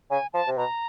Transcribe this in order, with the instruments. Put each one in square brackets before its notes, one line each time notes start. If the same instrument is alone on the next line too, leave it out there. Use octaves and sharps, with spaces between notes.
[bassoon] C#3 [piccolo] G#5
[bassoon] F3 [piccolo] A5
[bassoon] C3
[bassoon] B2 [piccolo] A#5